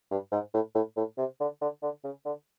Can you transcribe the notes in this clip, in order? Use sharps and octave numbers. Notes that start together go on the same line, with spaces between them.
G2
G#2
A2
A2
A2
C3
D3
D3
D3
C#3
D3